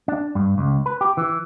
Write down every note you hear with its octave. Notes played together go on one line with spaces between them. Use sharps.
D4
G2
C#2
B4
G4
E3